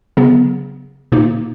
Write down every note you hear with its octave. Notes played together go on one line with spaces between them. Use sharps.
C#3 F#3 B3
A#2 A#3 D#4